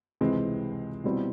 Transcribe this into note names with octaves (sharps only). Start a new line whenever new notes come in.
C#2 C3 E3 G#3 C4
B2 G3 C4 E4